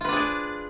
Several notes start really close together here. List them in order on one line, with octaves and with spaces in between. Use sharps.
F4 B4 D4 G#4 D5